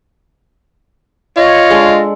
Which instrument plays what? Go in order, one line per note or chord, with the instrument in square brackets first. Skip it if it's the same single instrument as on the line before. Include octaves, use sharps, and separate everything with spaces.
[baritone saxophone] F4 [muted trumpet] C#5 [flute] D#5
[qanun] G#3 D4 A4